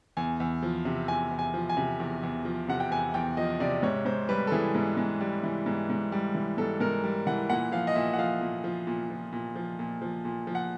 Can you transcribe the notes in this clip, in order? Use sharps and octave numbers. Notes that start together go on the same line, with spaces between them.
E2 G#5
E2
F3
C3
E2 G#5
E2
G#5
F3
G#5
C3
E2
E2
F3
C3 F#5
G5
E2 G#5
E2 G5
F3 D#5
C3 D5
G#2 C#5
G#2 C5
G3 B4
A4
E3 G#4
G#2
G#2
G3
E3
G#2
G#2
G3
E3
G#2 A4
G#2 A#4
G3
E3 F#5
A#2 F#5
F3 F5
D#5
A#2 E5
F#5
F3 F5
A#2
F3
A#2
F3
A#2
F3
A#2
F3
A#2
F3
F#5